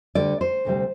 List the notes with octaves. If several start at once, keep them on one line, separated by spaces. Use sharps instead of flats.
D2 D3 G3 D5
C5
D2 C3 G3